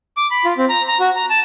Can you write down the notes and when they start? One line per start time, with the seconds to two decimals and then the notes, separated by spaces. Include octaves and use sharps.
0.17 D6
0.31 B5
0.45 F4
0.58 C4
0.69 A#5
0.88 A#5
1.00 F#4
1.16 A#5
1.30 A5